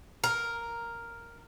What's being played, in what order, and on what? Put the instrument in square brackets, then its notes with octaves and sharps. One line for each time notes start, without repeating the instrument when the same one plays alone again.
[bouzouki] A#4